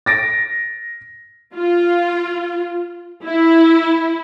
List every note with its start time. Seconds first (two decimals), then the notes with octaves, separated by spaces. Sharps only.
0.06 A6 A#6 D7
1.54 F4
3.25 E4